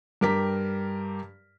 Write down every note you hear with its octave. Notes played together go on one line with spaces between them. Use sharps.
G2 G4 A#4 D6 B6